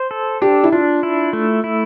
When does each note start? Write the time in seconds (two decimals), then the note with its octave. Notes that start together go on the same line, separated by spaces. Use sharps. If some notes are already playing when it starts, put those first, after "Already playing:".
Already playing: C5
0.11 A4
0.42 D4 G4
0.64 E4
0.72 D4 F4
1.03 E4
1.33 A3
1.64 E4